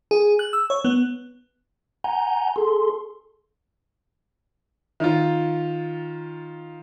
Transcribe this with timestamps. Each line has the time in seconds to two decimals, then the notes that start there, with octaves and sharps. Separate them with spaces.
0.11 G#4
0.39 F#6
0.53 E6
0.70 C#5
0.85 B3
2.04 F#5 G#5 A#5 G6
2.56 G#4 A4 C6
5.00 D#3 F4